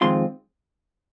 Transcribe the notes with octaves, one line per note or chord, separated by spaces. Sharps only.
F2 D#3 G#3 C4 F4 C6